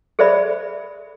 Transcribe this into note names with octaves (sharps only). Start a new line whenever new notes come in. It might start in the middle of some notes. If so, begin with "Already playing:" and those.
G#4 A4 C5 D5 E5 B5